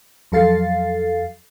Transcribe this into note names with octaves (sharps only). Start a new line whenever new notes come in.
F2 F#3 A4 F5 A6 C7